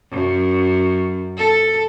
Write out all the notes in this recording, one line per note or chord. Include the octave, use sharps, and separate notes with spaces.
F#2
A4